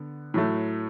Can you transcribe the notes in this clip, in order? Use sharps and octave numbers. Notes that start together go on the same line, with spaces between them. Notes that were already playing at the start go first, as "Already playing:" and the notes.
Already playing: D3 B3
A2 F#3 A3